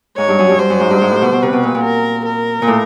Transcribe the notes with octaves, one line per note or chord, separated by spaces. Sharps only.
G#2 C#5
G2
F#2
G2
G2 C5
F#2
G#2
G2
G#2
A2
B2
B2
C3 B4
B2
A#2
A#2
A#4
A#4
A#2
A2